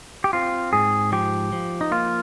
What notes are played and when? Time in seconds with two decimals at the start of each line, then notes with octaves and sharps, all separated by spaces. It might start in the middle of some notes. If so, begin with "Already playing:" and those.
0.24 G4
0.33 C4 F4
0.73 G#2 G#4
1.12 F3 G4
1.52 F3
1.81 D#4
1.91 A#3 F4